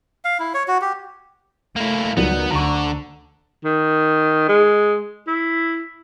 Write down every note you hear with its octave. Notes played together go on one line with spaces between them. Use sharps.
F5
E4
C#5
F#4
G4
A3 A#3 E4
C#2 D#3 F#3 G3 B3
D2 D3 A#5 C#6
D#3
G#3
E4